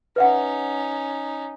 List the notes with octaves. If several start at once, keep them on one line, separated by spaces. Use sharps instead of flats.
C#4 D#4 B4 E5 F#5